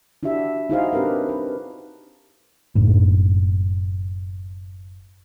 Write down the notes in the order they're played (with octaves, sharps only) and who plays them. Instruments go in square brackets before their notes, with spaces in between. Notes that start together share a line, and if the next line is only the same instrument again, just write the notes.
[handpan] D4 E4 F#4 G4 E5
D#4 E4 F#4 G#4 C5 F5
C4 D4 G4 A#4 B4
B4
[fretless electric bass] F#1 A2